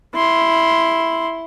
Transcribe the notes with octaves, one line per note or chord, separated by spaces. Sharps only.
E4 C6